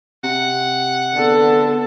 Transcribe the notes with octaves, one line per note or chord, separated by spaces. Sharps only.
C3 F#5
D3 B3 A4